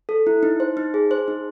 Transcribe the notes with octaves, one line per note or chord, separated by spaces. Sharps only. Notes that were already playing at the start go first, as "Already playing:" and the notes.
A4
E4
D#4
C5
D#4
G#4
C5
D#4